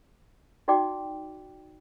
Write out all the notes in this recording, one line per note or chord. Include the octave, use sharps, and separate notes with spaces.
D#4 F#4 D5 G5 D6